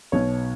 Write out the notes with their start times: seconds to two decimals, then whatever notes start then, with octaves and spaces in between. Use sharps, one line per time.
0.12 B1 B2 C#5